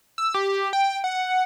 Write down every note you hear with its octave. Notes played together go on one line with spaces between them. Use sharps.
E6
G4
G5
F#5